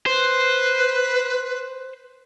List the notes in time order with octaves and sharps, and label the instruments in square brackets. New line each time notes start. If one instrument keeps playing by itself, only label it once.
[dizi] B4 [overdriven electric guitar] C5